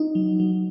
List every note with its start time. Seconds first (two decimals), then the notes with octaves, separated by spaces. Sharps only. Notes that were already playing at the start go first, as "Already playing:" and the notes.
Already playing: D#4
0.15 F#3
0.40 F#3